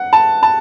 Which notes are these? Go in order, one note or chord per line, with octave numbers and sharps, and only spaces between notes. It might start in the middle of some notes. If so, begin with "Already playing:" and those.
Already playing: F#5
A5
A5